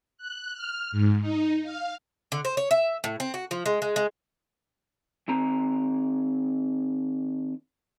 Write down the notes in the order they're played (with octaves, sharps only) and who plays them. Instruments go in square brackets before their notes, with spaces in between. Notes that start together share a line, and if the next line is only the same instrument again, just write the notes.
[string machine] F#6
F6
G#2
D#4
F5
[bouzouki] D3
C5
C#5
E5
A2
C4
F#4
F3
G#3
G#3
G#3
[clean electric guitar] D#3 C4 A#5